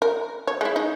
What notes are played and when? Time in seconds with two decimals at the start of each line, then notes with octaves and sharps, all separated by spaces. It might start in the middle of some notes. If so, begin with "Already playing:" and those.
0.02 A#4
0.47 C#5
0.61 G#3 E4
0.76 D#4